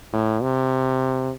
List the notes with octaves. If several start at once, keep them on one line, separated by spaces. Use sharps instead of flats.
A2
C3